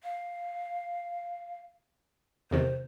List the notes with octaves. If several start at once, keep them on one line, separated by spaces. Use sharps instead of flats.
F5
E2 C3 D#3 C5